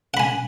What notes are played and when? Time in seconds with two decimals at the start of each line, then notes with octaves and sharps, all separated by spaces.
0.14 F#5
0.17 B5
0.20 G#5